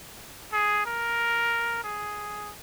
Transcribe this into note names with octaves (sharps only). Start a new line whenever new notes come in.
G#4
A#4
G#4